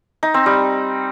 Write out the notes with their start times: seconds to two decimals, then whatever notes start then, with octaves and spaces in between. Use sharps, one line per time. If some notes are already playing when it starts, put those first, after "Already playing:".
0.23 D#4
0.34 C4
0.46 G3